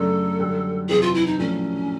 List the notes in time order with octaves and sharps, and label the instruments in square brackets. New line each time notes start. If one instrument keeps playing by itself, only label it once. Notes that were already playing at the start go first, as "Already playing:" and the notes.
Already playing: [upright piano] F#2 C#3 F#3 A3 D4 [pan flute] A4
[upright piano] F#2 D3 G3
[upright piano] F#1 E2 C3 E3 [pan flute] G#4
[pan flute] F4
E4
D#4
[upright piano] A#1 A2 F#3 A3 D4 [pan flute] C#4